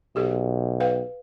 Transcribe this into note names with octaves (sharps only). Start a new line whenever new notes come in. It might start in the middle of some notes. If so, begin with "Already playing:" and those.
B1 G4 A4
B4 F5 G5